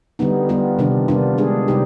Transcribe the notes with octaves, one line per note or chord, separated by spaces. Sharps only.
D3 G3 B3 D#4
G3 B3 F4
C3 D#3 G3 D4
C3 G3 B3 D4 F4
G#3 D4 G#4
C3 G3 C4 D#4 G4